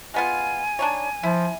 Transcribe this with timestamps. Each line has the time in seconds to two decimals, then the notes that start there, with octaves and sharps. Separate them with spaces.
0.14 G#3 B3 F4 G#5
0.79 D4 D#4 C#5
1.23 F3 E4